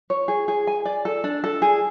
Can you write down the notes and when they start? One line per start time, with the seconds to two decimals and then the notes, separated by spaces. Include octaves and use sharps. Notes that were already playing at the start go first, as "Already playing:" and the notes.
0.10 C#5
0.28 G#4
0.48 G#4
0.67 G#5
0.85 D5
1.05 A4
1.24 D4
1.44 A4
1.62 G#4